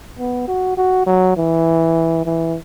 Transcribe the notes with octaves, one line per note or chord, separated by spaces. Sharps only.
B3
F#4
F#4
F#3
E3
E3